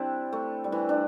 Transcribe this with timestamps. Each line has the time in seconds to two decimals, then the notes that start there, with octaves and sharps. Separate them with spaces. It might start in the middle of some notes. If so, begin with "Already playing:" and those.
Already playing: G3 C4 D4 E4
0.33 A3
0.64 G3
0.72 E3
0.89 D4